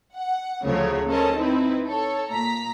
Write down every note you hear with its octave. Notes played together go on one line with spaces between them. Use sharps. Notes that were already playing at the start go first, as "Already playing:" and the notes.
F#5
D2 C#3 F3 F#3 A3 C#5
C#4 A4 A#4 C5 D#5 A5
C4 D#4 E4 B4
A4 C#5
A#2 A#5 B6